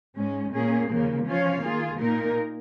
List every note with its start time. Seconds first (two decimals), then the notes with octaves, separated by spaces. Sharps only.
0.17 G#2 G#3 C#4
0.53 A#2 A#3 C#4 G#4
0.89 D#2 C#3 F3 A#3
1.26 F3 C#4 F4 C#5 F5
1.63 D#3 A#3 F4 G#4
2.00 A#2 A#3 D#4 A#4